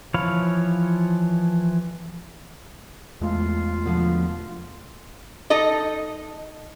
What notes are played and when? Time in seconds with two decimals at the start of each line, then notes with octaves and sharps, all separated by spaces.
0.14 E3 F3 C#5 F5 B5
3.21 E2 G#3 A3 F4
3.85 B2 D3 F3
5.50 D#4 A4 D#5